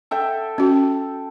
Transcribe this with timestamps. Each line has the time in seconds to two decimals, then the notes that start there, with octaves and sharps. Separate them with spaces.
0.11 A4 E5 G5
0.58 C#4 F#4